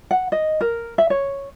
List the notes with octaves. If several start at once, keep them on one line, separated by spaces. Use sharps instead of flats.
F#5
D#5
A#4
E5
C#5